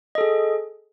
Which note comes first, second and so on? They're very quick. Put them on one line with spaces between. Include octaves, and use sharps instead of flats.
D#5 A4 G#4